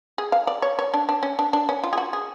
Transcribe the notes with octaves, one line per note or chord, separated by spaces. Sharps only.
G#4
F5
D5
C#5
C#5
D4
D4
C#4
D4
D4
C#4
F4
G#4
F#4
G#4